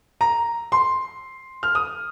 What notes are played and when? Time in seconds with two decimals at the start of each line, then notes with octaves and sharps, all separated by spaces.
0.21 A#5
0.72 C6
1.63 F6
1.75 D#6